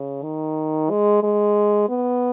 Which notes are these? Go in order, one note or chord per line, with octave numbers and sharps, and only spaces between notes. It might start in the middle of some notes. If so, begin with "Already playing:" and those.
Already playing: C#3
D#3
G#3
G#3
B3